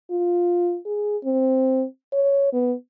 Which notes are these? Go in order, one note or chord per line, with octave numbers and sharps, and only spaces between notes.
F4
G#4
C4
C#5
B3